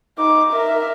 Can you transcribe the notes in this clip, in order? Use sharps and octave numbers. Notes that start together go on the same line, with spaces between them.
D#4 D6
A#4 E5